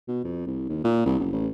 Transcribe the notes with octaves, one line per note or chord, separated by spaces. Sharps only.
B2
F2
C2
D#2
A#2
C2
F#1
A1